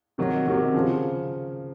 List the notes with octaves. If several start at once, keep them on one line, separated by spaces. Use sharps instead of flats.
C3 D#3 F#3
C3 D#3 F#3
C#3 F3